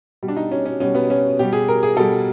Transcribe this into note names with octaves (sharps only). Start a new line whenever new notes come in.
B2 G3
D4
D#4
C#4
C#4
B2 G3 C#4
B3
C#4
B2 G3 G4
G#4
A#4
G#4
B2 G3 A4